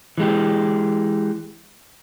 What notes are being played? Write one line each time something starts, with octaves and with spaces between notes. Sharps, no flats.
E3 G#3 G4